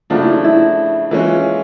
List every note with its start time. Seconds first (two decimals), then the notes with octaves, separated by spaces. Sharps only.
0.10 C#3 F3 A3 D4 F4 F#4
0.22 E4
0.33 D#4
0.44 E4
1.11 E3 G#3 C#4 F4
1.19 F#4
1.27 F4